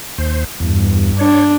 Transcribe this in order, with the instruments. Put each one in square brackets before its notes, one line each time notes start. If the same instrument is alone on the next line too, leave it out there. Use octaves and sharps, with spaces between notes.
[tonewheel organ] D#2 C5
[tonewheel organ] E2 [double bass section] G2
[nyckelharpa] D4 [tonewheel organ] C#5